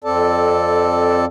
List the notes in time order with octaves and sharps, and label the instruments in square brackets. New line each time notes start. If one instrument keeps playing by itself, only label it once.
[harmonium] F2 C4 A4 D5 A5